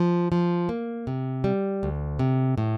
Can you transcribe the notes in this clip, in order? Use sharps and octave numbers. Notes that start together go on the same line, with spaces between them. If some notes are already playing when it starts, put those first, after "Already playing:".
Already playing: F3
F3
A#3
C3
G3
D2
C3
A2